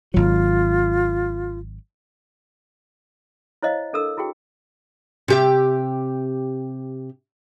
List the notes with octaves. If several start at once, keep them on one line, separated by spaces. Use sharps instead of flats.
G#1 F#3 F4
E4 C5 C#5 D#5 F5
D4 A4 A#4 E6
E4 F#4 G#4 G5
C3 G4 E5